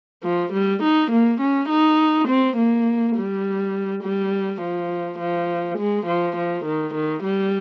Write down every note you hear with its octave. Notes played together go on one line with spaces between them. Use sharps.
F3
G3
D#4
A#3
C#4
D#4
C4
A#3
G3
G3
F3
F3
G#3
F3
F3
D#3
D#3
G3